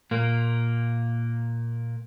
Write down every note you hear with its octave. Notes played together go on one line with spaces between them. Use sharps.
A#2 A#3